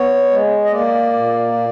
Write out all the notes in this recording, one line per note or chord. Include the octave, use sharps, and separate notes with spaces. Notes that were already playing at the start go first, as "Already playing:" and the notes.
Already playing: B3 C#5
G#3
D#5
A#3 D5
A#2
A#2